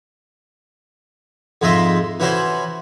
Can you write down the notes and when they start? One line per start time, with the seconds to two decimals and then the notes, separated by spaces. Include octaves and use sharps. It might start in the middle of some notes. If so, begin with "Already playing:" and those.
1.61 F2 G#2 F3 D#5 E5 C6
2.20 E3 C#4 E4 F#4 C5